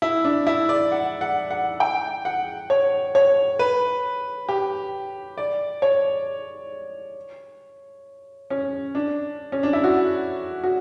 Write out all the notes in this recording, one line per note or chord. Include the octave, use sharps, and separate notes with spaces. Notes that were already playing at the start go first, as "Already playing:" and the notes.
E4
D4
E4
D5
F#5
F#5
F#5
G5
F#5
C#5
C#5
B4
G4
D5
C#5
C#4
D4
C#4
D4
E4
F#4
F#4